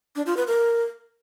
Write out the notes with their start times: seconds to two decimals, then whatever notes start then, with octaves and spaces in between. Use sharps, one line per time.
0.16 D4
0.26 F4
0.37 B4
0.47 A#4